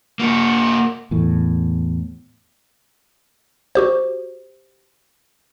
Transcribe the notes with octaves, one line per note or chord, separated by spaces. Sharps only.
A#3 F#4
E2 A2
F#4 G4 C5